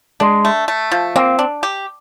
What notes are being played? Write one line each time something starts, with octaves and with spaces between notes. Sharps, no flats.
G#3 D4
A3
A3
F3
A#3 C4
D4
G4